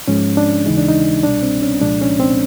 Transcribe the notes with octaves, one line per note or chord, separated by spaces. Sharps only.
G#2 F3 G#3 C#4
D4
D#2 C#3 E3 G#3 D#4
D4
D#4
C2 B2 G3 D4
C4
C#4
C2 A#2 F3 G#3 D4
C#4
C4